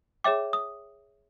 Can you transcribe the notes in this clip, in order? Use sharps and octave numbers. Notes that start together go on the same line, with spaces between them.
G#4 C#5 E5 G5 D6
D#6